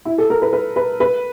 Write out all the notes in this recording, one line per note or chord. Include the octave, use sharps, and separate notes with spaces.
E4
A4
A#4
B4
B4
B4
B4